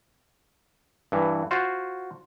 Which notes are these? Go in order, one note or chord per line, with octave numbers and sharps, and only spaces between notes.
G2 E3
F4 F#4 C5